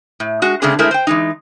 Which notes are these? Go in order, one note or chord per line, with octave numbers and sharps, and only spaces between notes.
A2
G#3 F#4
C#3 G#3 A3 C4 D4 G#4
G#3 A3 E4 G#4 A#4 C5
C5 G5
E3 G#3 D#4